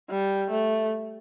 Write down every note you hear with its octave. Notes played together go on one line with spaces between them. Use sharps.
G3
A3